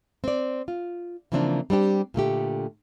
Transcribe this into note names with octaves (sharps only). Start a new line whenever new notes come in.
C4 D5
F4
C#3 E3 F3 A#3 C4 D4
G3 C4 D4 G4
A#2 D3 A3 G4